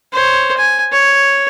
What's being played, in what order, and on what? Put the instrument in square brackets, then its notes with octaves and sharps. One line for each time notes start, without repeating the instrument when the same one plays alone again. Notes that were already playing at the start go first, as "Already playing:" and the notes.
[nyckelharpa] C5 C#5
G#5
C#5